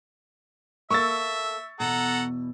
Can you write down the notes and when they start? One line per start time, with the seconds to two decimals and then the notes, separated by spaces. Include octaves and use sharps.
0.91 A#3 A4 E5 C#6 E6 A6
1.80 E2 B2 A4 F#5 A#5